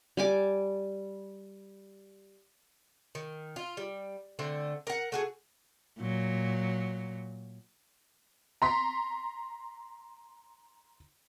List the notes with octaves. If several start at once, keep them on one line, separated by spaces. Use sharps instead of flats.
G3 G#5 D6
D#3
F4
G3
D3 A3 C4
A#4 F#5
A3 F#4 G#4
A#2 F#3
A#5 C6 B6